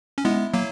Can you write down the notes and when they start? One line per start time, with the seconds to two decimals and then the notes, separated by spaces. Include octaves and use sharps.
0.18 C#4
0.24 G#3 B3 E4
0.54 F#3 A#3